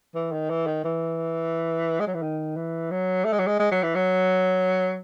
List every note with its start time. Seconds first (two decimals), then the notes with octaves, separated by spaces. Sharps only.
0.15 E3
0.32 D#3
0.50 E3
0.66 D#3
0.84 E3
2.00 G#3
2.07 F#3
2.14 E3
2.22 D#3
2.56 E3
2.91 F#3
3.25 A3
3.33 G#3
3.39 F#3
3.47 G#3
3.59 G#3
3.72 F#3
3.83 E3
3.95 F#3